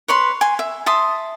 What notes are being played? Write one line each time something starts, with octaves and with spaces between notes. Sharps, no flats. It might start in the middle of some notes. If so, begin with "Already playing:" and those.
B4 C#5 B5 C6
G#5 C6
E5
E5 A5 C6 D#6